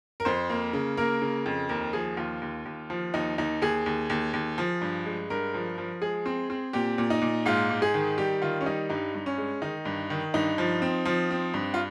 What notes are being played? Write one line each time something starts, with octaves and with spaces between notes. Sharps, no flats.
A#4
F2 C5
A#3
C#3
A#3 A#4
C#3
F2
D#2 A#4
F3 G#4
D#2 F4
D#2
D#2
F3
D#2 D#4
D#2 D#4
D#2 G#4
D#2
D#2
D#2
F3
G2
G#3
G2 A#4
F3
F3
G#3 G#4
C4
C4
A#2 G4
A#2
D#4
A#2
G#2 F4
G#2
G#4
D#3
G3 G4
D#3 F4
C#4
G3 D#4
G2 D#4
G2
C#4
G#3
D#3 D#4
G2
D#3
G2 D#4
F3
C4
F3
C4
G2
F4